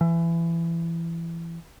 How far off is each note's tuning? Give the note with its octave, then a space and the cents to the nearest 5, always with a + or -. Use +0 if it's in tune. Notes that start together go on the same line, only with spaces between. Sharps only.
E3 +25